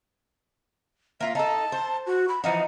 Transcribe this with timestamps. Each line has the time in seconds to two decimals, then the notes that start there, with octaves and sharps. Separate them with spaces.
1.21 A#3 F4 E5
1.35 D#4 A4 A5
1.72 C5
2.06 F#4
2.29 B5
2.44 E3 F3 D#4 F#5